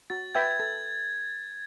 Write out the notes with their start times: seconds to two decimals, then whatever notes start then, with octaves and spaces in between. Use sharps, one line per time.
0.10 F#4 A6
0.35 B4 E5 G5 G#6
0.50 G#6
0.60 A4 A6